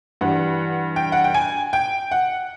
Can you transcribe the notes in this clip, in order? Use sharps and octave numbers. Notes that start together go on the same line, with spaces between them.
G2 E3 G3 F#5
G5
F#5
G5
G#5
G5
F#5